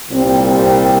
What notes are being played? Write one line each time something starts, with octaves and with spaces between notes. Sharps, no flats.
C2 A#2 G3 C4